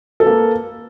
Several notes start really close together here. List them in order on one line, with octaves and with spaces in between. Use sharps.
A4 B4 A#3